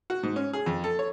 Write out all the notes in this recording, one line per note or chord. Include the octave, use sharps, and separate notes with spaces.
F#4
G#2
C#4
G#4
F2
A4
C#5